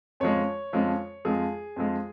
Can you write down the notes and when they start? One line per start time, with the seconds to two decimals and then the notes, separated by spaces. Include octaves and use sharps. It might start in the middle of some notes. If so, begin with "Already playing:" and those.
0.20 F2 C#3 F3 G#3 C#5
0.73 F2 C#3 F3 G#3
1.25 F2 F3 G#3 G#4
1.76 F2 F3 G#3